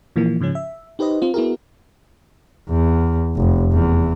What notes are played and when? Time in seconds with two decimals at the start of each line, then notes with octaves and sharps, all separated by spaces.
0.16 A#2 E3 F3 A#3
0.40 G#2 C#3 F3 C#4
0.55 E5
0.99 D#4 G4 B4 C5 D#5
1.22 C4 F4
1.34 B3 E4 F#4 G#4 A#4
2.70 E2
3.36 F1
3.72 E2